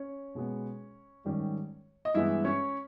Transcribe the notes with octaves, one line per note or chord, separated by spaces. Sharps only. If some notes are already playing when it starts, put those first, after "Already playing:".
Already playing: C#4 C#5
B2 G#3 B3
G#2 D#3 G3 C#4
D#5
G2 E3 G#3 B3 E4 E5
C#4 C#5